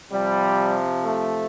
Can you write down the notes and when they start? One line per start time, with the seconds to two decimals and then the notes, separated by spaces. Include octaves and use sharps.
0.11 C3 F3 G3
1.04 A3